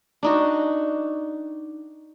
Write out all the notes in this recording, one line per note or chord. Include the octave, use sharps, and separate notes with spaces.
D4 D#4 F#4